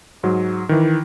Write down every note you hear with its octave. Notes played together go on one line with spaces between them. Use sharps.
G#2 F#3
D#3 E3